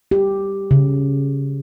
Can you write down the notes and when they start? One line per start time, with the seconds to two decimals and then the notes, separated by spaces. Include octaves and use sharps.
0.11 G4
0.71 C#3